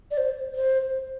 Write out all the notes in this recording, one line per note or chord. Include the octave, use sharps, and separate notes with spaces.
D5
C5
C5